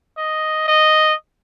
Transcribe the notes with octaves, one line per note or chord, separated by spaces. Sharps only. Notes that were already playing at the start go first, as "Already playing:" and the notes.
D#5
D#5